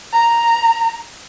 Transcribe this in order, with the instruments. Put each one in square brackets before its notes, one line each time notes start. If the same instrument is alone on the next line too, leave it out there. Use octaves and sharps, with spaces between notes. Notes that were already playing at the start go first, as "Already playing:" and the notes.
[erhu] A#5